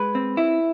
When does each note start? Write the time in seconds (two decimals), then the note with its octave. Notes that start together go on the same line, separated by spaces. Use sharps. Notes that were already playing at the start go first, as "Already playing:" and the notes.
Already playing: G#3 B4
0.15 C4
0.37 E4